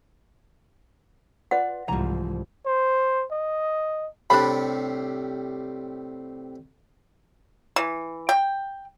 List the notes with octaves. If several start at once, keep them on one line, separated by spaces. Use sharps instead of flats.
F4 B4 D5 F#5
C2 G#2 E3 F3 A#5
C5
D#5
A2 C3 G3 D4 B5
E3
G5